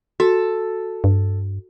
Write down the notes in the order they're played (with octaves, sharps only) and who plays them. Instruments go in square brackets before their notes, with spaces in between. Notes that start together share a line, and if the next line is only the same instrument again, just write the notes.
[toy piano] F#4 [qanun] A4
[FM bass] G2